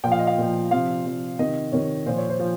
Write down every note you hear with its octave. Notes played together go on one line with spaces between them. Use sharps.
A#2 F3 G5
F5
D#5
F5
A#2 F3
C3 F3 F5
C3 F3
C3 D#3 D#5
C3 D#3 C#5
A#2 F3 C5
C#5
C5
F3